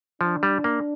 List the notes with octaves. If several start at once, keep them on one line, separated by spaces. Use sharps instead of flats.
F3 D4
G3
A#3